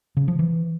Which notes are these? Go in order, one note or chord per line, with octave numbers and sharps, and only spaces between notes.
C#3
F3
E3